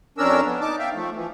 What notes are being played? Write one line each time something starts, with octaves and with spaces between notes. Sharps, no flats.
F2 C#4 D4 A#4 E6
B3
D#4 A5 D6
E5 F5 G5
F3 A3
E3 F3